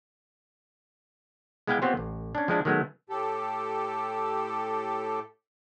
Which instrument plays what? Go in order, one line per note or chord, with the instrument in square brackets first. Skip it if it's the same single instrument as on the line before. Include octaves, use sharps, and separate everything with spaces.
[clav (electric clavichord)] G#3 B3 E4 F5 G5 G#5
B3 C4 F4 G4 C5 C#5
A1
C#4 D4
F3 G#3 D4 E4
D#3 F#3 G#3 A3 B3
[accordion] A2 G4 A4